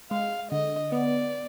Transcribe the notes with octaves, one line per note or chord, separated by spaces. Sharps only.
G#3 F5
D3 D#5
B3 D5